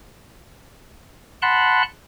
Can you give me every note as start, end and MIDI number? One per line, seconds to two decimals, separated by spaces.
1.42 1.83 78
1.42 1.83 81
1.42 1.83 83
1.42 1.83 84
1.42 1.83 90